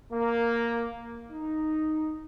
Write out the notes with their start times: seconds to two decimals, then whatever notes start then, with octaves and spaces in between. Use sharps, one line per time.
0.10 A#3
1.30 D#4